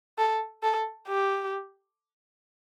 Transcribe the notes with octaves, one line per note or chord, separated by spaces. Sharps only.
A4
A4
G4